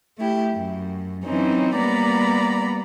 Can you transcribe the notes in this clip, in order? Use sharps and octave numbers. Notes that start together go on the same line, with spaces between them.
A3 E4 G4
F#2
E3 F#3 C4 C#4 D#4
G3 A#3 B3 D5 A#5 B5